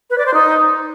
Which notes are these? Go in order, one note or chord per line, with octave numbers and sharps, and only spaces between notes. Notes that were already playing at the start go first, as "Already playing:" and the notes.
B4
D5
C5
D#4